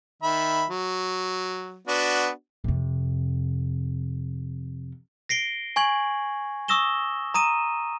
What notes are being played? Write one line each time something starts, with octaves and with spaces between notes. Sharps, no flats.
D#3 E5 B5
F#3
B3 D4 F#4
F2 C3
A#6 C7 D7 G7
G#5 C#6 G#6 F#7
C#6 D#6 E6 A#6 E7 G7
A#5 D#6 D#7 E7